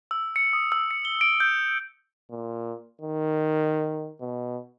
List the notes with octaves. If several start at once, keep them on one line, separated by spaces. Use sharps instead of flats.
E6
C#7
D#6
E6
C#7
G7
D7
G6
A#2
D#3
B2